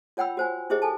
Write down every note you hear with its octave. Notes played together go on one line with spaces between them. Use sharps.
F4 C#5 F#5 G5 B5 E6
F#4 C5 G#5
E4 G4 G#4 C5 D#5
A4 G#5 A5